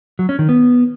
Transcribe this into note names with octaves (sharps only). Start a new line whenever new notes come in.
F#3
C#4
D#3
B3